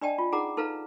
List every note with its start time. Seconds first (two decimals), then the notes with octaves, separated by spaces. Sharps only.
0.01 D4 D5 D#5 G5 A5
0.18 F4
0.32 D#4 G#4 F#5 A#5 D6
0.57 D#4 A4 B4 F5 A#5